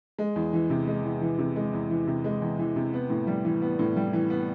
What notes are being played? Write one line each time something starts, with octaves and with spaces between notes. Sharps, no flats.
G#3
E2
E3
C3
G#3
E2
E3
C3
G#3
E2
E3
C3
G#3
E2
E3
C3
B3
A2
G3
E3
B3
A2
G3
E3
B3